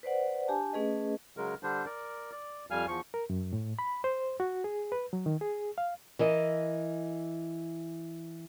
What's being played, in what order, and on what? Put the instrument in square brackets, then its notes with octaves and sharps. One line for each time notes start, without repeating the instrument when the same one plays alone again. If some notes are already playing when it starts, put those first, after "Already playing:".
[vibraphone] B4 C5 D5 F#5
D4 G4 G#5 A5
A3 C#4 G#4 B4 D#5
[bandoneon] C#3 F#3 G#3 A#4
D3 G3 D4 C5
A#4 D5
D5
F2 G3 F5 G#5 F6
E2 F3 C#6
[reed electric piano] A#4
F#2
A2
B5
C5
F#4
G#4
B4
F#3
D#3
G#4
F5
[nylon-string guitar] E3 A#4 D#5